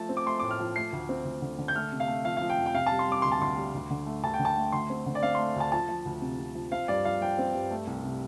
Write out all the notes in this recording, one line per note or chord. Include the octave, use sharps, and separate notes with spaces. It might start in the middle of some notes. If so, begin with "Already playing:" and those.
Already playing: F3 A3 A5
C4
D6
A3 C6
A2 D6
F6
F3
A3 C7
D2
C4
D2
D3
D3
G6
A3 F6
C3
F5
A3
F3 F5
F3 F5
G5
F2
G5
C3 F5
G3 A5
C6
G3 D6
D2 C6
A5
D2 C6
G3
D2
D3
A3
D2 A5
G5
D3
A5
A3
D2 C6
C4
D3
D5
C4 F5
A3 C6
D2 A5
F3 A5
F3
D2
C3
C3
F3
C4 F5
G2 D5
F3 F5
F3 G5
C4
G2
A3
C2
C3